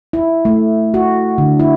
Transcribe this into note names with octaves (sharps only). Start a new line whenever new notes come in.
E4
A3
F#4
D3
E4